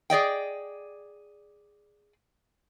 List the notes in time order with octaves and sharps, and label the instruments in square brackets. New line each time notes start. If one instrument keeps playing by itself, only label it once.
[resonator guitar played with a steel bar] G#4 D5 D#5 G5